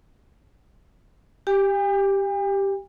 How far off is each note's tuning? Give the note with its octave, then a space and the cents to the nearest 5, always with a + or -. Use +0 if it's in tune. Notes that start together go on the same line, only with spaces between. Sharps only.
G4 +0 G5 +45